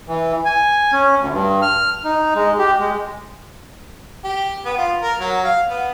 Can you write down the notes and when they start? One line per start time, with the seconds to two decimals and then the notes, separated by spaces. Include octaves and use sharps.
0.08 E3
0.45 G#5
0.93 C#4
1.18 D2
1.31 G2
1.62 F6
2.04 D#4
2.35 G#3
2.59 G4
2.79 G#3
4.24 G4
4.65 B3
4.78 F4
5.02 A#4
5.20 F#3
5.44 F5
5.70 B3